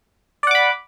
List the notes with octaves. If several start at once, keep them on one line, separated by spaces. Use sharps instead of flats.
D5 F#5 B5 D6